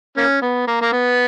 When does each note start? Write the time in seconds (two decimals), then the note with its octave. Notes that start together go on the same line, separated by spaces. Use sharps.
0.17 A#3 C#4
0.42 B3
0.67 A#3
0.82 A#3
0.93 B3